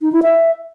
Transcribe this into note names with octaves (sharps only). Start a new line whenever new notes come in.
D#4
E4
E5